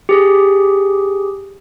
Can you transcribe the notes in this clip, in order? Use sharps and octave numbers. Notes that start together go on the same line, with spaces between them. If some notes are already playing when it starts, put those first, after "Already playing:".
G4 G#4